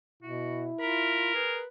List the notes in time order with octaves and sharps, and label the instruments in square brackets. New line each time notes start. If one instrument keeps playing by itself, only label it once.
[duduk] B2 [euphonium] E4 [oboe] F#4
[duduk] F4 [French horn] A#4 [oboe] B5
[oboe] G#4 [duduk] B4